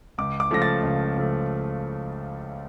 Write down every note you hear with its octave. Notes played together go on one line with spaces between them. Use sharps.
C#2 D6
D6
C#3 F3 A3 A#6
A6
C#2
C#3 F3 A3